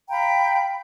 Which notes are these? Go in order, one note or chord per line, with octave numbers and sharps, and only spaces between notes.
F5 G5 A#5 B5